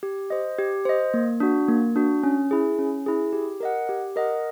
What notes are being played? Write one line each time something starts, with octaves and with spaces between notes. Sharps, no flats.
G4
C5 D#5
G4
C5 D#5
A#3
D4 F#4
A#3
D4 F#4
C#4
E4 G#4
C#4
E4 G#4
G4
A#4 D#5 F#5
G4
A#4 D#5 F#5